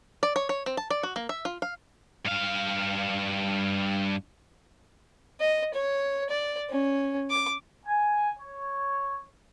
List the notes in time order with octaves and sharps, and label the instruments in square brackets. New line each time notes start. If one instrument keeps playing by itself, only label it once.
[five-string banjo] D5
C#5
C#5
C4
A5
D5
F#4
A#3
E5
F4
F5
[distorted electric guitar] G2 F5
[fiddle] D#5
C#5
D5
C#4
D6
[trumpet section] G#5
C#5